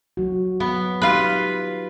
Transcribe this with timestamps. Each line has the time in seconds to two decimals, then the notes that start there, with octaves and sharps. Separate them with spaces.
0.17 F#3 F#4
0.60 F#3 B3
1.02 D#4 F4 G4 B4